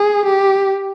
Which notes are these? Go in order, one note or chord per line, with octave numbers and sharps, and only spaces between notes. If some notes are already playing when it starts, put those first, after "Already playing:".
Already playing: G#4
G4